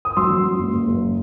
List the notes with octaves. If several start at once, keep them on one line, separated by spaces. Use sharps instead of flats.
D#6
F#3 C6 E6
F#2
F#3
F#1
F#1
F#1